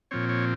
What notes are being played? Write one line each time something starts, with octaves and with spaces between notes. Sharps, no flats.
A#2 F3 C4 C#5
C#5